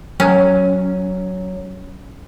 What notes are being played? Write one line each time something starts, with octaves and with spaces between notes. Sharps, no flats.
F#3 C#4